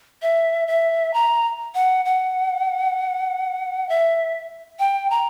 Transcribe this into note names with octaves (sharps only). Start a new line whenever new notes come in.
E5
E5
A#5
F#5
F#5
E5
G5
A#5